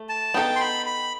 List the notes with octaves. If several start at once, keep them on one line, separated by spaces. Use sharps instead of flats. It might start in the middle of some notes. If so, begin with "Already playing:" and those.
Already playing: A3
A5
B3 D#4 A4 G5
C6
B5
B5